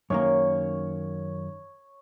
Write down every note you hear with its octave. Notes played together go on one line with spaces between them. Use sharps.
F#2 D#3 A#3 C#5